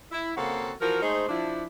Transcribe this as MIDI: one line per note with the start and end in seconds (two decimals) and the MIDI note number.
0.12 0.32 64
0.37 0.73 49
0.37 0.73 58
0.37 0.73 60
0.37 0.73 66
0.37 0.73 69
0.37 0.73 78
0.81 1.02 52
0.81 1.02 53
0.81 1.02 66
0.81 1.02 70
1.02 1.28 56
1.02 1.28 57
1.02 1.28 63
1.02 1.28 68
1.02 1.28 72
1.29 1.65 53
1.29 1.65 62
1.29 1.65 64